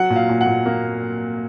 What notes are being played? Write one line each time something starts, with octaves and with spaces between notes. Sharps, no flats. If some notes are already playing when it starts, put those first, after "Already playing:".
Already playing: F#3 F#5
A#2
F5
A#2
F#5
A#2
A#3